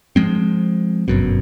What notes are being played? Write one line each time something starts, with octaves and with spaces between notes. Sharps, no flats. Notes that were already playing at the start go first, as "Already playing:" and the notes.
F3 F#3 G#3 C4
G1 F#2 B2